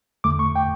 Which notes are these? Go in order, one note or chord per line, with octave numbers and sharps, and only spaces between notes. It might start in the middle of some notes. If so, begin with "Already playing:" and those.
E2 D3 A3 D6
C#6
G5